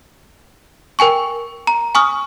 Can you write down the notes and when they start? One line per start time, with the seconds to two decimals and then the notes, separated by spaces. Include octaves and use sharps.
0.99 A#4 G5 G#5 C#6
1.67 A#5
1.95 G#5 C#6 D#6 F6